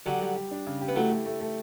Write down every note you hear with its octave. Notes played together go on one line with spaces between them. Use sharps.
D3 F#3 G4
G3
G4
D4
C#3
G4
B3
F#3 A3 E4
A3
A3
A3